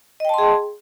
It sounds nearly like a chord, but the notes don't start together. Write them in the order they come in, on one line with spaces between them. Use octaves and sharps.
D#5 G5 A5 C6 G#4